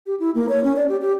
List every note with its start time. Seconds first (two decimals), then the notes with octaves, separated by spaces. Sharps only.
0.07 G4
0.20 E4
0.35 A#3
0.49 C#5
0.64 C#4
0.76 D5
0.88 G4
1.01 G4